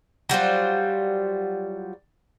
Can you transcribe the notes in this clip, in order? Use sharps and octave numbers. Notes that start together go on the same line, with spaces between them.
F#3 G3 F4 C5